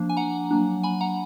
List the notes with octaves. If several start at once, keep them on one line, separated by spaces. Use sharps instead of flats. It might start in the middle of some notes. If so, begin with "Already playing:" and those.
Already playing: F3 A#3 D4
G#5
F#5 A#5
F#3 A#3 D4
G#5 B5
F#5 A#5